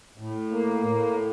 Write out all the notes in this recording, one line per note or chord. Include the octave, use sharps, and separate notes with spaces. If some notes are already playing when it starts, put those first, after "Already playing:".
A2
A#3
A2